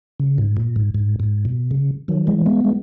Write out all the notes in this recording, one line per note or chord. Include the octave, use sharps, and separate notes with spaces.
C#3
G#2
A#2
G#2
G#2
G#2
B2
C#3
D#3 F#3
E3 G#3
G#3 B3
G#3